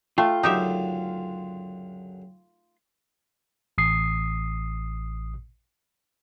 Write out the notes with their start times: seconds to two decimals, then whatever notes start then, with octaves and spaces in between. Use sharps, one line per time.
0.18 A3 F4 G5
0.43 C#2 F#2 D3 D#4 G4 E5
3.78 A1 D#6 C7